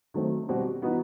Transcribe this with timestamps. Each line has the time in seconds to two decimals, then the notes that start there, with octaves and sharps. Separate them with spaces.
0.14 D#3 F#3 A3 C4
0.48 B2 G3 C4 F#4
0.82 E3 B3 D#4 F#4 B4